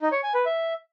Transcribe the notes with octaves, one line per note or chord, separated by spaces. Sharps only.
D#4
C#5
G#5
B4
E5